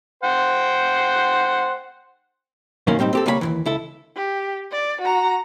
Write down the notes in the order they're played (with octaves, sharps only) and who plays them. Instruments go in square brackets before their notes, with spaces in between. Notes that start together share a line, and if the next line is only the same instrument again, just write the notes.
[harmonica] C5 F#5 G5
[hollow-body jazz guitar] F#2 B2 D#3 F#3 A#3 C#4
A2 G3 C4 D#4
C4 G4 A4
C#2 G3 A#3 C#5 G#5 B5
D#2 G#2 E3
C#2 E4 A4
[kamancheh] G4
D5
F#4 A#5